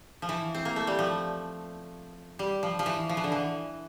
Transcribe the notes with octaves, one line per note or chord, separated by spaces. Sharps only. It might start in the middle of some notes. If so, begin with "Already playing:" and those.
F3
E3
C4
A#3
A3
G3
F3
G3
F3
F3
E3
F3
E3
D3
E3